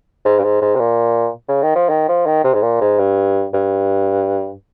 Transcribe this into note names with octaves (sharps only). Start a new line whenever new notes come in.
G#2
G2
G#2
G#2
C3
A#2
C#3
D#3
F3
D#3
F3
D#3
C3
G#2
A#2
G#2
G2
G2